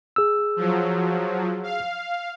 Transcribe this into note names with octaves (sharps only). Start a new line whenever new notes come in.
G#4 E6
F3 F#3
F5